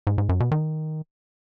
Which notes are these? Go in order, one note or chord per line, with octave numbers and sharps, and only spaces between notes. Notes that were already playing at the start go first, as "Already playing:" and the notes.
G#2
G#2
F#2
B2
D#3